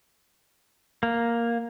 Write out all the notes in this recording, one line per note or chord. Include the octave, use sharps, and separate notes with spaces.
A#3